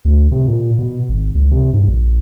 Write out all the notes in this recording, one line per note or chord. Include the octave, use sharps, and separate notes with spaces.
D2
C3
A#2
B2
G#1
C#2
C3
G2
A#1